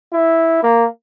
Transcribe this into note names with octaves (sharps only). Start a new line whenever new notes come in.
E4
A#3